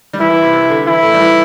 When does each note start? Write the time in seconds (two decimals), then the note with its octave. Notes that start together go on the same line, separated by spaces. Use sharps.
0.13 G3
0.20 E3 E4
0.30 E3
0.42 C3
0.53 C3
0.70 D3
0.87 E3 E4
1.03 A3
1.14 G3
1.20 E3